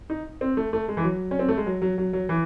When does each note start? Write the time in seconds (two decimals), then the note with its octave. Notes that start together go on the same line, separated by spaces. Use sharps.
0.10 D#4
0.41 C4
0.57 A3
0.73 A3
0.88 G#3
0.97 E3
1.03 F#3
1.31 C#4
1.39 C4
1.49 A3
1.57 G#3
1.66 F#3
1.82 F#3
1.98 F#3
2.13 F#3
2.29 E3